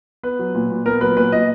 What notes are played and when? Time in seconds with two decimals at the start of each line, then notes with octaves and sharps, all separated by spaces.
0.23 B3 B4
0.39 F#3
0.54 A#2
0.70 A#2
0.86 B3 A#4
1.01 F#3 B4
1.17 A#2 B4
1.32 A#2 D#5